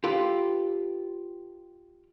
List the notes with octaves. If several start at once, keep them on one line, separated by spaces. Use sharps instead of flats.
F4 G4 A4 B4